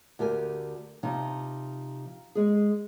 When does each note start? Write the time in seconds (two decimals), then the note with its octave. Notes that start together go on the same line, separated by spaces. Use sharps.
0.19 D2 G4 A#4 G#5
1.03 C3 F3 D#4
2.35 G#3 G#4